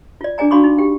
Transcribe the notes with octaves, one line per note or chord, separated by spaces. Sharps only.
F4 D5
D4 G#4 D5 G#5 A#5
D4 F#4 F5 B5 C#6 D6
D#4
G4 G5